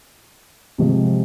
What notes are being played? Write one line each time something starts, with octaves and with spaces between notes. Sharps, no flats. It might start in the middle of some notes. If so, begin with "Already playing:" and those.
C3 F3 G#3